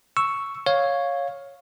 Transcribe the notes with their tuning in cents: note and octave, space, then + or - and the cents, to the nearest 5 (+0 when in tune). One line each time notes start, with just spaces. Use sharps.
C#6 +0 E6 +0
C#5 +0 F5 +10